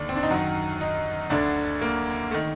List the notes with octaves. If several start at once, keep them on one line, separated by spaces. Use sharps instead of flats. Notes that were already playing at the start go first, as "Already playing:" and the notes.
Already playing: D#2 D3 D5
C4
D4
D#4
F#2 D#3 F#4
D#4
D2 D3 D4
A#3
A3
D#3